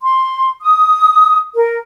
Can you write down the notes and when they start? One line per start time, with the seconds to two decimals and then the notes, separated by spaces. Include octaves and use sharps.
0.02 C6
0.61 D#6
1.55 A#4